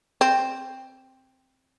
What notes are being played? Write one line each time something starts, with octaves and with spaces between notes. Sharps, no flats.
C4